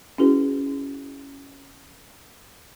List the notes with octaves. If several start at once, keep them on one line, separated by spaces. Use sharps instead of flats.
C#4 E4 F#4 G#4 B4